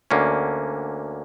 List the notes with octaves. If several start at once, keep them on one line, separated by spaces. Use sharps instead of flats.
D2 D3 A#3 C#4